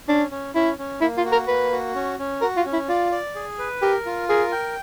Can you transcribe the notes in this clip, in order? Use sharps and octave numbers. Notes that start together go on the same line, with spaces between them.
C#4 D4
C#4
C#4 E4
C#4
A#3 E4
F4
F#4
A#4
A#3 B4
F#4
C#4
C#4
F#4 A#4
F4
C#4
E4
F4 D5
D5
G#4
B4
G4 A#4
F4
G#4 A#4
G5